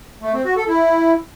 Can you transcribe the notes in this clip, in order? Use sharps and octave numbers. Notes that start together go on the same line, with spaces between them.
A3
C4
F#4
A4
E4